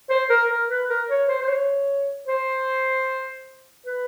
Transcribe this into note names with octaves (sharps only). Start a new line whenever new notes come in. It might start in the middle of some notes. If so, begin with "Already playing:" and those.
C5
A#4
A#4
B4
A#4
C#5
C5
C5
C#5
C5
B4